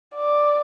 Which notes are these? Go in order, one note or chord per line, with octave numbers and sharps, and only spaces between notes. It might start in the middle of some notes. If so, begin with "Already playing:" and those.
D5